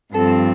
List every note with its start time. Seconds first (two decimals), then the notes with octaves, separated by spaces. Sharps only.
0.14 G2 F3 C4 A4